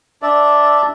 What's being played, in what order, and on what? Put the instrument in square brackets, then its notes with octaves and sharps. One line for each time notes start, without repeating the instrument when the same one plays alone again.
[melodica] D4 D5 E5